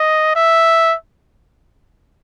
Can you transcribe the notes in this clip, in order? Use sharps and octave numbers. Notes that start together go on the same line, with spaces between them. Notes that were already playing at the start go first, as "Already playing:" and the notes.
Already playing: D#5
E5